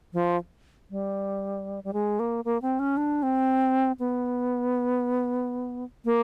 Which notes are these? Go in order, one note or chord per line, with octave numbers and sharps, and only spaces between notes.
F3
G3
G3
G#3
A#3
A#3
C4
C#4
D4
C4
B3
A#3